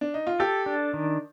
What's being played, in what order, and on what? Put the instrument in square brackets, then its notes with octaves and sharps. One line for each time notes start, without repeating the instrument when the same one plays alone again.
[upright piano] D4
D#4
F4
[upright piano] G4 [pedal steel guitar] A4
[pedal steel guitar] D4
D#3